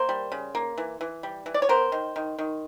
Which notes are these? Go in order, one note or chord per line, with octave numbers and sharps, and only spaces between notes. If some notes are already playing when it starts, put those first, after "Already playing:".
Already playing: A#3 A#4 C5
G3
C#3
A#3
E3
E3
G3
E3
D5
C#5
B3 A#4 C5
D#3
D#3
D#3